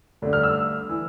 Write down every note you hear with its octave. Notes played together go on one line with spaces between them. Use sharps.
G2 D3 A3 D4
F6
E6
E3